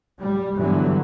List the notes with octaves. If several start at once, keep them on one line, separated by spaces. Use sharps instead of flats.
G3
G2 D3 E3 F#3 G3 B3